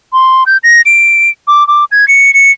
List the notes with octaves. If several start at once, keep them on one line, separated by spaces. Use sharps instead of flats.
C6
G6
A#6
D7
D6
D6
G#6
C#7
C#7